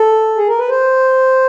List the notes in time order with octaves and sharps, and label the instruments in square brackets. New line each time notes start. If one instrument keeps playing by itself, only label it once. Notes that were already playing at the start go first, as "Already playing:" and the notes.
Already playing: [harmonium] A4
G#4
A#4
B4
C5